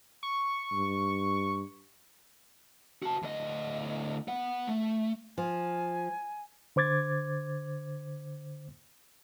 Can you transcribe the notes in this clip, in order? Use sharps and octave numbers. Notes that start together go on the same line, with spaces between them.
C#6
G2
F#4 A5
D2 D#5
B3 F#5
A3
F3 G#5
D3 C5 D6 G#6 A6